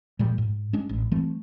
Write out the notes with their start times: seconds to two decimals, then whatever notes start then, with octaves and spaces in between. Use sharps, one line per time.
0.19 A#2 F3 G3 G#3
0.38 G#2
0.73 G#3 C#4 D4
0.89 A1
1.12 E3 G3 A3 C4